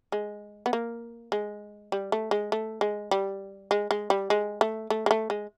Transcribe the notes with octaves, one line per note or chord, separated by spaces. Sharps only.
G#3
B3
A#3
G#3
G3
A3
G#3
A3
G#3
G3
G#3
G#3
G3
G#3
A3
A3
G#3
A3
G#3